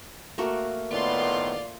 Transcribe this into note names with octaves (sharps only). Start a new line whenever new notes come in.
A3 A#3 F#4
A2 D#3 B3 F4 D5 C6